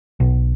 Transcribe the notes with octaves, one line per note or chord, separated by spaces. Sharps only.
B1